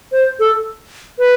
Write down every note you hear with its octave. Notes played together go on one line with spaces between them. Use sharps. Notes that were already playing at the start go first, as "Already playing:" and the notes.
C5
A4
B4